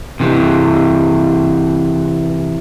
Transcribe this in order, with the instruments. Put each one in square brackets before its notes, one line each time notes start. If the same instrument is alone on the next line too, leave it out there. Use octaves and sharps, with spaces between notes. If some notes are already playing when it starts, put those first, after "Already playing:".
[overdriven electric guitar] C3 E3